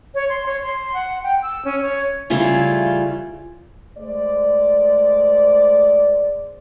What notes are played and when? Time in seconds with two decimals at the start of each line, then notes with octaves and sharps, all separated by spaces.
0.15 C#5
0.29 C6
0.46 C#5
0.63 C6
0.94 F#5
1.23 G5
1.42 E6
1.65 C#4
1.82 C#5
2.30 C#3 E3 G3 A3 F4 G#4
3.98 G#3 A3 C5 D5